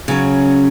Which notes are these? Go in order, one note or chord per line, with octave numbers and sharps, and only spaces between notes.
C#3 F#3 C#4